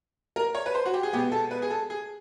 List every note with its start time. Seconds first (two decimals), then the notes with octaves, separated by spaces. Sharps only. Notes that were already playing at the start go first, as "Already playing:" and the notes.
0.36 A#4
0.55 C#5
0.66 B4
0.75 C5
0.85 F#4
0.94 G4
1.03 G#4
1.13 B2 G#3 B3 G4
1.32 A4
1.51 B4
1.62 G#4
1.70 A4
1.90 G#4